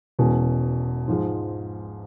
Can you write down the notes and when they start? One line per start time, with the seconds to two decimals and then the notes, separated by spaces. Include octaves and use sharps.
0.19 E1 E2 B2 G#3 C#4
1.08 G#2 F3 G#3